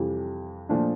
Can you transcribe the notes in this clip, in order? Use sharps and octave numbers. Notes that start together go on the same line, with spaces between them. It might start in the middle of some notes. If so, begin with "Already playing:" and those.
Already playing: F2 C3 E3 G3
A#2 F3 A3 D4